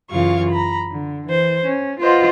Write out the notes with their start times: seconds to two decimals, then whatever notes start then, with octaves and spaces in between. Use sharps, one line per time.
0.11 F#2 C#3 E3 F4 F5 C#6
0.49 A#5 B5
0.91 D3
1.27 E3 C5
1.65 C#4
1.99 F4 B4 C5 D#5 F#5